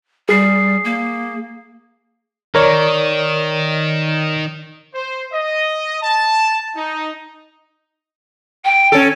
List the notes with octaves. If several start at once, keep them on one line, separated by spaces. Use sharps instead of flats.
G3 G#4 C7
A#3
D#3 A#4 C#5 D5
C5
D#5
A5
D#4
G5
C#4 A4